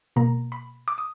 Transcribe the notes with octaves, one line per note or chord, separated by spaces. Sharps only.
B2 A#3 A#5
B5
D6
D#6